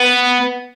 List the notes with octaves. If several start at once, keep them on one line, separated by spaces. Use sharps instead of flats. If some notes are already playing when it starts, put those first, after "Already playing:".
Already playing: B3